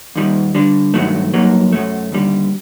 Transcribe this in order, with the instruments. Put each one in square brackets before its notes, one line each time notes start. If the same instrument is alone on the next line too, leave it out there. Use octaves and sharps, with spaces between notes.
[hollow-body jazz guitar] D#2 D#3 G3
D3 G3 D4
G2 D#3 F#3 A3
G2 F#3 A#3 D#4
F#2 F#3 A3
D#2 D3 G3